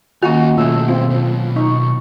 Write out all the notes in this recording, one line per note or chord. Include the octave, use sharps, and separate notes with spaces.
D#2 D#3 A#3 C#4 F4 F#4 G#5
B2 A3 G#4 A4 E6
C4 F4
B2 F#3
D#4 C#6